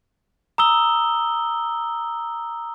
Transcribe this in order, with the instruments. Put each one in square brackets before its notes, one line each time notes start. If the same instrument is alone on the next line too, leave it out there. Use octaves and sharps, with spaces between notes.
[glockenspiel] A#5 D#6 E6 G7